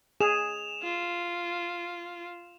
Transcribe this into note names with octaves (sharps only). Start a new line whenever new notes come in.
G#4 E7 F7
F4